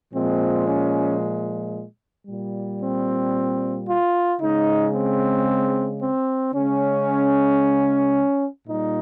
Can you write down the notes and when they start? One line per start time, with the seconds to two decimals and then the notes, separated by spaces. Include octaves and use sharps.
0.14 A#2 F3 G#3 C4
0.67 C#4
2.27 A#2 G3
2.81 C4
3.87 F4
4.40 C#3 G#3 D#4
4.93 C4
6.00 C4
6.54 C#3 G#3 C#4
8.67 A#2 G3 D#4